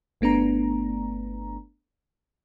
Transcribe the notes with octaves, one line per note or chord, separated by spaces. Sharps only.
G1 A3 B3 D4 A#5